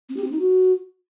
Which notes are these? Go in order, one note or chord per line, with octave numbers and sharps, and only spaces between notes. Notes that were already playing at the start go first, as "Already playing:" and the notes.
C4
G4
C4
D#4
F#4